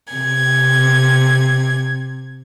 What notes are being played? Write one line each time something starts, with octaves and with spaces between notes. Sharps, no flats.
C3 G#6